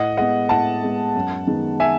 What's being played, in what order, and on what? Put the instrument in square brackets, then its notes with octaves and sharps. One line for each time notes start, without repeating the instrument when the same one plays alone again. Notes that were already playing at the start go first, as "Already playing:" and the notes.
Already playing: [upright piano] A2 [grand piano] D#5 F#5
[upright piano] G#3 B3 [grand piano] D#5 F#5
[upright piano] A2 [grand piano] F#5 A5
[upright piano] G#3 B3
F#2
D#3 G#3 B3
[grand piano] E5 G#5